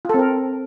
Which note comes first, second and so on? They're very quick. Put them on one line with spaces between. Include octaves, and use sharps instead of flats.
F4 A4 C4 A#4